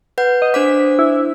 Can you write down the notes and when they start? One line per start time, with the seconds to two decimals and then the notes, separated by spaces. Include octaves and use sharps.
0.18 B4 F#5 G6
0.42 D#5
0.54 D4 C5 D6 B6
0.99 E4